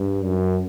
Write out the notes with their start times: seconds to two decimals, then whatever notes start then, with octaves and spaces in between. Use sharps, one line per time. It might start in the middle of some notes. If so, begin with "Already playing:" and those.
Already playing: G2
0.24 F#2